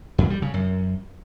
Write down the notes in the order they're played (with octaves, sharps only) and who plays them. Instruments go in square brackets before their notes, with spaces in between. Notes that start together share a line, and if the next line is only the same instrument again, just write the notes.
[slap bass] F2
G3
C#3
F#2